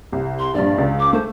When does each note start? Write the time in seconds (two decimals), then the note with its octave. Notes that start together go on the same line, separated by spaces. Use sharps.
0.12 C2
0.39 C6
0.54 A#1 G2 D5
0.78 C#2
0.99 D6
1.13 A3 C5